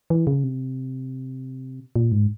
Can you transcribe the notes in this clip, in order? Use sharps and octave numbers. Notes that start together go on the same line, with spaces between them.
E3
C#3
C3
A#2
G#2